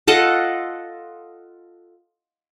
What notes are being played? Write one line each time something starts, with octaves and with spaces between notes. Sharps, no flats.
F4 A4 D#5 F#5